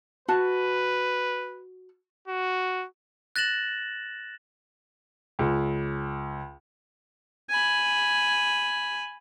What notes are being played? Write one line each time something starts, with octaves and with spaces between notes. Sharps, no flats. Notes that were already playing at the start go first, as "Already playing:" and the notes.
F#4 B4 A5
F#4
F#6 A6 A#6 E7 F#7
C#2
G#5 B5